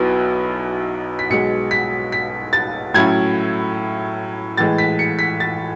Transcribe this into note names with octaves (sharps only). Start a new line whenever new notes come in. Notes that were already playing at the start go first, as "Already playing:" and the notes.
Already playing: B1 B2 F#3 B3 E4
B6
B1 B2 G#3 C#7
B6
B6
A6
A2 F#3 C#4 E4 G#6
A2 E3 G#3 A6
B6
C#7
B6
A6